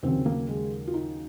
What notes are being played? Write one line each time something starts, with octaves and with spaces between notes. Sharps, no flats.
D#2 C#3 F#3 C4
A#3
G#3
F4
D#4